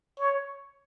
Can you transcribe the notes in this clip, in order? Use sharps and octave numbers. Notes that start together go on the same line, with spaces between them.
C#5